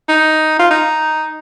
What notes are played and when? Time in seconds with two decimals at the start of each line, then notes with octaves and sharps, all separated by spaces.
0.09 D#4
0.60 F4
0.71 D#4